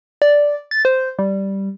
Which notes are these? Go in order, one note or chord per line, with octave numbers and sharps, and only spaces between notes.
D5
A6
C5
G3